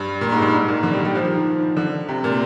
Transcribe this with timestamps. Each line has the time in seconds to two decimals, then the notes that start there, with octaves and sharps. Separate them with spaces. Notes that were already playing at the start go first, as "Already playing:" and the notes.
Already playing: G2
0.21 A#2
0.32 G#2
0.42 G2
0.53 G#2
0.68 A#2
0.83 D3
0.93 G3
1.05 G3
1.15 F3
1.25 D#3
1.77 D3
2.09 C3
2.24 A#2